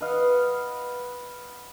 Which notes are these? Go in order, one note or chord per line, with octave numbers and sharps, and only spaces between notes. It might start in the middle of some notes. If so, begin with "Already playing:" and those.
B4 D#5 F5 F#5